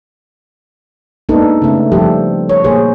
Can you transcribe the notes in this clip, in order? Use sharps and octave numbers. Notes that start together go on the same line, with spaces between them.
G#3 A#3 B3 D4 D#4 A4
C#3 A3
F3 G3 G4 A4
C#5
A#2 A#3 G#4 C5